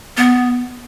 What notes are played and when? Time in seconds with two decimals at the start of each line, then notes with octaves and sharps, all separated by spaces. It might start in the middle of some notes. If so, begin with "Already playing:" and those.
0.17 B3